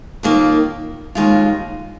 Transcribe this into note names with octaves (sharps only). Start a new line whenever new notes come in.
D#2 D#3 A#3 F4
D#2 D#3 G#3 F4